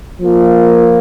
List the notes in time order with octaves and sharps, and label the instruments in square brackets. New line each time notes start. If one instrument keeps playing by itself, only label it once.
[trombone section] F3 A#3 F4 A#4